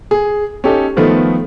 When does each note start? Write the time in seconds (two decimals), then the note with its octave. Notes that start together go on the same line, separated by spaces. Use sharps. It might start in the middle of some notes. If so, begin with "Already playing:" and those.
0.11 G#4
0.64 C#4 D#4 G4 A4
0.97 D#3 F3 A3 B3